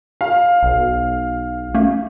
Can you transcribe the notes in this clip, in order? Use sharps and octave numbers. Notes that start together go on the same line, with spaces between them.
F5
B1
A3 A#3 C#4